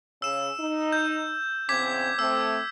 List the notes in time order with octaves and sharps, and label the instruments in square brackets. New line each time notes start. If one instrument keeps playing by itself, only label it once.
[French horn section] C#3 [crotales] E6 E7
[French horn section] D#4
[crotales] G6
[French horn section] E2 C#3 C4 [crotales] D6 G#6 B6
[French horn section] A3 C4 [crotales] E6